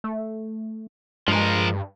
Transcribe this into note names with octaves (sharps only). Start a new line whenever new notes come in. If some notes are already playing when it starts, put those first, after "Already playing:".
A3
G2 F3 G#3 A#4